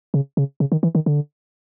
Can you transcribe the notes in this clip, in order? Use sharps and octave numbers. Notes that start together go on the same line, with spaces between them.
C#3
C#3
C#3
D#3
E3
D#3
D3